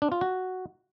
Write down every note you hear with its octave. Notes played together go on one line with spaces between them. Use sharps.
D4
F4
F#4